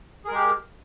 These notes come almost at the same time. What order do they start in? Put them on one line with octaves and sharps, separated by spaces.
G#4 A#4 G#3 G4